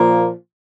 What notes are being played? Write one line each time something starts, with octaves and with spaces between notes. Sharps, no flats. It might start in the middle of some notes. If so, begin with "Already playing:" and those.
Already playing: A#2 F3 A#3